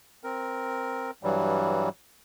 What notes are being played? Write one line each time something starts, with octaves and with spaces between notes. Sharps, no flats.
C4 A#4
G2 E3 F#3 G3